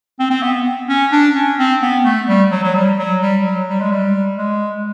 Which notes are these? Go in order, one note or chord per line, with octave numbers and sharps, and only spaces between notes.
C4
C4
B3
C#4
D4
C#4
C4
B3
A3
G3
F#3
F#3
G3
F#3
G3
F#3
G3
G#3
G3
G#3